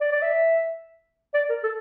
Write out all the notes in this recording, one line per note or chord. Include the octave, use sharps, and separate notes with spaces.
D5
D5
E5
D5
A#4
A4